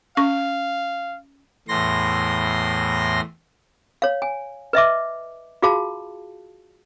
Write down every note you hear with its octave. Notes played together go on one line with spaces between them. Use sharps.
C#4 F5 C#6
E2 A2 C6 A#6
C#5 F5
G#5
B4 D#5 E5 D6
F4 F#4 G#4 F5 A5